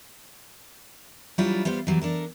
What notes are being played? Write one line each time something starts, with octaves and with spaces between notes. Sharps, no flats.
F#3 G3 D4 E4 F4
G3 B3 F4 C5
E3 F#3 G3
D4 A4 A#4